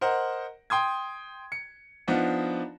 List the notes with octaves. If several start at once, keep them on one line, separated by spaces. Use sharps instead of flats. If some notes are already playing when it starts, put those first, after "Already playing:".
A#4 C5 D#5 F#5
G5 C6 D#6 G#6
C#7
F3 B3 D4 D#4 D#5